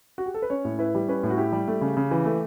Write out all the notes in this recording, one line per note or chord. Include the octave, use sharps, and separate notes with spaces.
F#4
G4
A4
B4
C#4 C#5
A2
E4 B4
G3
C#4 B4
A2
F#4
E4 G4
G3
A3
C#3
C#3
E3
A3